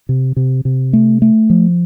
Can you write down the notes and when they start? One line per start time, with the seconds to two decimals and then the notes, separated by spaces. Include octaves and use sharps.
0.09 C3
0.36 C3
0.65 C3
0.93 A3
1.22 A3
1.50 F3